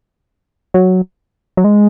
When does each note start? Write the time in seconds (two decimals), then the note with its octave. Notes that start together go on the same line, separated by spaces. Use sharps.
0.74 F#3
1.57 F#3
1.64 G#3